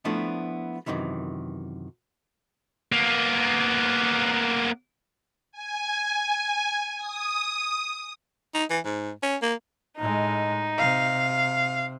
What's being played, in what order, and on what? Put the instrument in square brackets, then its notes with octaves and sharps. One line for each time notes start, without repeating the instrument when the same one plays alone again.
[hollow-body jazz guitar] F3 A3 B3 D4 E4
F#2 A2 C3 D#3 E3
[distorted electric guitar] A#3 B3
[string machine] G#5
D#6
[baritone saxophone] D#4
E3
G#2
C#4
A#3
[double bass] A2 G#3 [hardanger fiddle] D#4
[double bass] C3 [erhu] F5